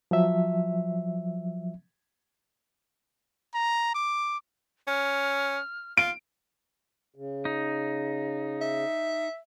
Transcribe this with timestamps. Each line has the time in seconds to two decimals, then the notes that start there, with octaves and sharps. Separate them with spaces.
0.11 F3 F#3 E5
3.54 A#5
3.95 D6
4.88 C#4 F6
5.97 F4 D7
7.16 C#3
7.45 D#4
8.61 E5